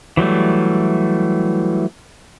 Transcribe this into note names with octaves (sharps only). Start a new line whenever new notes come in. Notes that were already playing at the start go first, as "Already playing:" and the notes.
E3 F#3 G3 A3